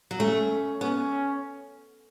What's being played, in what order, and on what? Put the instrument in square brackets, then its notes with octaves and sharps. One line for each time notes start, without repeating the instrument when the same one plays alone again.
[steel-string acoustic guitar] F#3
[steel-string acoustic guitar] A3 [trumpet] C#4
[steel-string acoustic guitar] B3 [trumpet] C#4